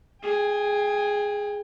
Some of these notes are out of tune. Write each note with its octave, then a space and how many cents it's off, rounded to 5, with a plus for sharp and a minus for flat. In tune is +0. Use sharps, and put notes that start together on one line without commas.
G#4 +0 G5 +30